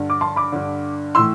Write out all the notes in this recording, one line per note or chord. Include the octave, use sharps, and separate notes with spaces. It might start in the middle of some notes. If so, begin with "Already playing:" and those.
Already playing: G2 D3
D6
A5 C6
B5 D6
G2 D3
A2 E3 C6 E6